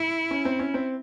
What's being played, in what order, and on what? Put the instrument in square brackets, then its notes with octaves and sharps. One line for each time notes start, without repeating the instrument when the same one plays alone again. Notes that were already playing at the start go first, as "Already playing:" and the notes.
Already playing: [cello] E4
[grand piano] C#4
C4
C#4
C4